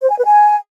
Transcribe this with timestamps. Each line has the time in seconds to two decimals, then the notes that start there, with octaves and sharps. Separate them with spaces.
0.02 C5
0.10 G#5
0.18 B4
0.26 G#5